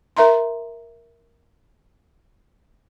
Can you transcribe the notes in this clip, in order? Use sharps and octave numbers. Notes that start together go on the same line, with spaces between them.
A#4 E5 A#5 C6